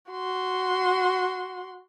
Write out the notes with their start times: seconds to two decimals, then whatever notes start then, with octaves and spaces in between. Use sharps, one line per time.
0.11 F#4 C6